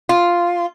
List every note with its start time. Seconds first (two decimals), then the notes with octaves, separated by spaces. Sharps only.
0.09 F4